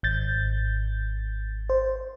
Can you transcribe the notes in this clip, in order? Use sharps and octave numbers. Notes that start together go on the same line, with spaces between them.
G#1 G6 A6
C5